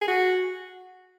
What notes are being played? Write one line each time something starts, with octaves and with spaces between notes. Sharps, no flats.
G#4
F#4